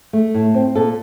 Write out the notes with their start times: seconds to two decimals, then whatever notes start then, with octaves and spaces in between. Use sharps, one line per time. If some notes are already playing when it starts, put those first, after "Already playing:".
0.13 A3
0.34 A2
0.54 C4
0.76 A#2 A4